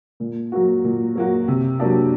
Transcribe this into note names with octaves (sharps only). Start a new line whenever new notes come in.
A#2
F#3 A#3 F#4
A#2
F#3 A#3 F#4
C3
F#3 A#3 D4 G4